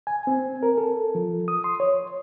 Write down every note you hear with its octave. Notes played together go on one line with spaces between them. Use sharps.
G#5
C4
A#4
A4
F3
D#6
C6
C#5